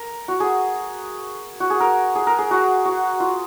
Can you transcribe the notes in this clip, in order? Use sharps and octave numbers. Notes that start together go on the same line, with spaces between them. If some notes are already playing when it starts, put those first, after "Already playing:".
Already playing: A#4
F#4
G#4
F#4
G#4
A#4
G#4
A#4
G#4
F#4
F#4
F4